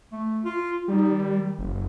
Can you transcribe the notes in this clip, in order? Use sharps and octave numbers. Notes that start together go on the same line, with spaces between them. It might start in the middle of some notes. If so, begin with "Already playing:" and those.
A3
F4
G3 D#4
D#3
F#1